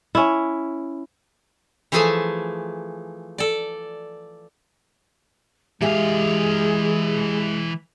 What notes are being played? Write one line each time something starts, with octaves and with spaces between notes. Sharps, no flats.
C#4 E4
E3 F3 A3 G#4 G#5 A5
A4 D5
E3 G#3 G4 G#4 E5 F5 G#5